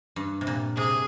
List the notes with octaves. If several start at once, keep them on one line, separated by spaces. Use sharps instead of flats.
G2
C3
A#2
C3 G#4